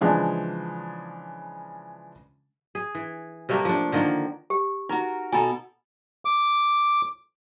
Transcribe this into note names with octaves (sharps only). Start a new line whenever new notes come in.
C#3 E3 F3 G#3 D4
G#4
E3
C3 G3 A3 A#3
F3 D4
D3 D#3 F3 A#3
G4
D#4 F#4 A#4 A#5
B2 A4 G#5 A#5 B5
D6